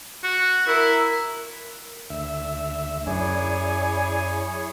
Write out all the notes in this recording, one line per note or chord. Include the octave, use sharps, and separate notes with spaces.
F#4
E4 A#4
D2 E5
F#2 E4 G#4 C#5 D5 G#5